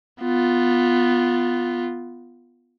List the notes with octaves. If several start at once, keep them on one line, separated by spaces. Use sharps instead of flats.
B3 F4